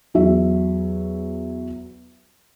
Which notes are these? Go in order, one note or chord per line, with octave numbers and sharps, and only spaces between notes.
E2 F#3 E5